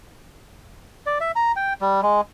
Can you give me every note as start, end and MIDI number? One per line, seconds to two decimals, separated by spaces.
1.06 1.18 74
1.20 1.31 76
1.36 1.52 82
1.56 1.73 79
1.81 2.01 55
2.03 2.21 56